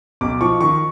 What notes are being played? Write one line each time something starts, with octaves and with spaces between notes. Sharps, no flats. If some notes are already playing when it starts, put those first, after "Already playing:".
B1 D6
F3 C#6
D#3 C#6